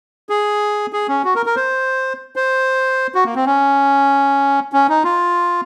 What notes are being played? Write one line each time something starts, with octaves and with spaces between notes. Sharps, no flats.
G#4
G#4
C#4
F#4
A#4
A#4
C5
C5
F#4
A#3
C4
C#4
C#4
D#4
F4